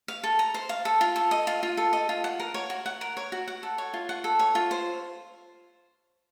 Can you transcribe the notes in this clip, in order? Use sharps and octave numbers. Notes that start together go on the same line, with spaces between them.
F5
A4
A#5
C5
F5
A4
F4
A4
D#5
F4
F4
A4
D#5
F4
F#5
A#4
C#5
F#4
F#5
A#4
C#5
F#4
F#5
A4
C#5
F4
F#5
A4
C#5
F4
C5